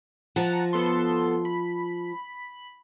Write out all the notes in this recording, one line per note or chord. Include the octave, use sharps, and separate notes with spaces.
F3 F#5 A5 A#5
B3 A4 C6
B5